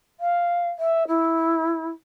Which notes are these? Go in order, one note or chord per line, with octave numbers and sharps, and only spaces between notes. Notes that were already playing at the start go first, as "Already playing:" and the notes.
F5
E5
E4